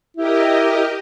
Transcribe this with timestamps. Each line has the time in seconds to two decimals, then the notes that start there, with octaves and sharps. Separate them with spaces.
0.17 E4 G4 A#4 D#5